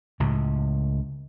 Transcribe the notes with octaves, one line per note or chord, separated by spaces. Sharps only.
C#2 A2 C#3